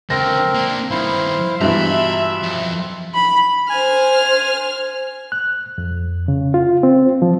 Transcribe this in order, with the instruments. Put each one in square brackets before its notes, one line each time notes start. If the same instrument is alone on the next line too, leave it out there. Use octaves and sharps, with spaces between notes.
[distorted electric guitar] C#2 D3 [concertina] C4 A#4 C5 [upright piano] A#6
[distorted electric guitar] A#3 D4
[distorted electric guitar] G2 D#3 [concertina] E4 C5 F5
[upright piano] G2 B2 E3 [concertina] F4 [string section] E5 [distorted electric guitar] A#5 B5
[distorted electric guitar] F2
[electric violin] B5
[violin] C5 F6 [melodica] G#5
[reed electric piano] F#6
F2
C#3
F4
C4
F3